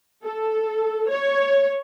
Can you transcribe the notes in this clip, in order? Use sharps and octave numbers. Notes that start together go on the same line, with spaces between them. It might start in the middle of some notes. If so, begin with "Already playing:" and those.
A4
C#5